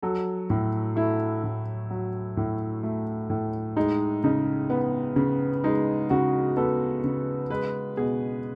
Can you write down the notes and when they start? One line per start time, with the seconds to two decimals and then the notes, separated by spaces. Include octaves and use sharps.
0.02 F#3 A4
0.50 A2
0.96 A3 E4
1.44 A2
1.90 F#3
2.37 A2
2.83 A3
3.30 A2
3.77 G#3 D#4
4.24 C#3 D#4
4.70 B3
5.16 C#3
5.64 G#3 D#4
6.10 C#3 F#4
6.57 B3 A4
7.04 C#3
7.50 G#3 B4
7.97 B2 G#4